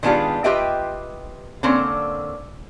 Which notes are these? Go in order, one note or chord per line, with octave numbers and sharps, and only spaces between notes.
D#3 G#3 B3 D4 F4 G4
F4 G4 B4 D#5 E5 G5
D3 A#3 C4 C#4